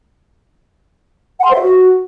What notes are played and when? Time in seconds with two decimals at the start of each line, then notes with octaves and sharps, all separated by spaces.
1.39 F#5
1.44 C6
1.49 C5
1.55 E5
1.60 F#4